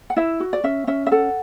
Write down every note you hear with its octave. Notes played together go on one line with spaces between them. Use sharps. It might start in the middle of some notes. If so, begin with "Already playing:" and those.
F#5
E4 E5
F#4
D5
C#4 E5
C#4 E5
E5
A4 F#5